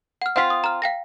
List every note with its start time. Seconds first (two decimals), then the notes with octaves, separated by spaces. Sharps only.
0.22 F#5 F6
0.36 C4 F4 F#5 B6
0.50 D#6
0.64 A#5 F6
0.82 F5 G5 A#6